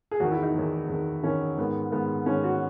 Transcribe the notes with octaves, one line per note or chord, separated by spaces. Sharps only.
G#4
E2 D#3 F#4
E4
D#4
E2 D#3
E2 D#3
E2 D#3 C#4
G#2 D#3 B3
G#2 D#3 B3
G#2 D#3 C#4
F#4